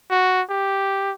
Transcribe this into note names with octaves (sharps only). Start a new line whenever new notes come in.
F#4
G4